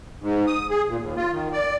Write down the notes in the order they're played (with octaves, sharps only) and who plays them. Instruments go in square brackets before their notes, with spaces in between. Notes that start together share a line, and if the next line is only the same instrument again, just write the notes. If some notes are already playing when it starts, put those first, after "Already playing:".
[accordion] G#2
D#6
G#4
A#2
D#2
F4
D#3
D5